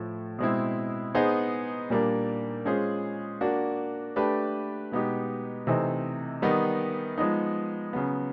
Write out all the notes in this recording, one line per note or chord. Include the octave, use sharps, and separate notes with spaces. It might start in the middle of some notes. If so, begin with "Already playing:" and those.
Already playing: A2 F3 A3
B2 G#3 C4 E4
B3 D#4 G#4 C5
A#2 G3 A#3 D4
G#3 C#4 F4 G#4 C5
A#3 D4 F#4
A3 D4 G4 B4
B2 G#3 B3 D#4 G4
C3 E3 A3 C4 D#4
D#3 G3 B3 D#4
F3 G#3 B3 D#4
C#3 F#3 B3